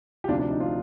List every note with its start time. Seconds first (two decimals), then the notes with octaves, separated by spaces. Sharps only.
0.24 G4
0.28 D2 C3 F3 D4 F4
0.39 D4
0.51 D#4
0.60 D4 F4